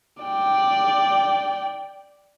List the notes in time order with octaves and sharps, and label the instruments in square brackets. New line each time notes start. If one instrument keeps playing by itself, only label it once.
[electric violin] D5 G5